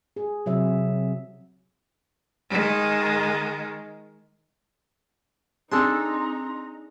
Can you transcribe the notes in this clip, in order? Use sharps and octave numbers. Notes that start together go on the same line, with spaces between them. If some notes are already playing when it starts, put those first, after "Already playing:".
G#4
C3 F#3 E5
D#3 G#3
C4 D4 D#4 G#4 A4 A#5 C6